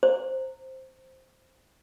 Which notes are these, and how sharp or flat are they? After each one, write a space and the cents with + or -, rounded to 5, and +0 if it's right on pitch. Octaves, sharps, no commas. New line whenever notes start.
C5 +0 A#5 -20